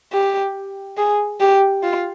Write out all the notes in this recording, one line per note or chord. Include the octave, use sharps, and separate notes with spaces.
G4
G#4
G4
F4